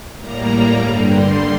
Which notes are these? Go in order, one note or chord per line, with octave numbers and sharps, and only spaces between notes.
A2 G3 A#3 A#5
G2 D3 G3
C6